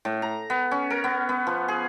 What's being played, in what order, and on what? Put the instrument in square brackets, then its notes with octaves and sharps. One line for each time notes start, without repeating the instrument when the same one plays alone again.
[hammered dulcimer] A2
A#5
B3
C#4
A#4
B3
B3
F3
G#4